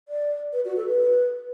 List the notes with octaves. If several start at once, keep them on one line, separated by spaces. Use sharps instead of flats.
D5
B4
F#4
A4
B4